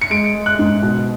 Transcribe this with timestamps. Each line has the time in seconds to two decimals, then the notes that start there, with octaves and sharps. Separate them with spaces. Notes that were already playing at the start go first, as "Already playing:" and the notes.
0.02 C#7
0.10 G#3 D7
0.34 G#3
0.46 F#6
0.59 G#2
0.82 B2